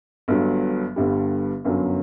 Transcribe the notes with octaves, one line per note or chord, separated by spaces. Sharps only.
G1 G2 F#3
G1 G2 D3 G3
G1 F#2 D3 F#3